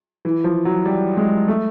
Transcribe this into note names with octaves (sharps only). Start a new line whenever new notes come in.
E3
F3
F#3
G3
G#3
A3